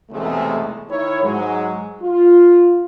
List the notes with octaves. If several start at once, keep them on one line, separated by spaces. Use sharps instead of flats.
B1 E2 C3 G#3 A3
D#3 E4 C#5
G#2 F#3 G#3
F4